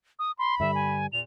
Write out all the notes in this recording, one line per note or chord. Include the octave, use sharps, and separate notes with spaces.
D#6
B5 C6
G2 D3 G3 E5
G#5
E2 A#2 F7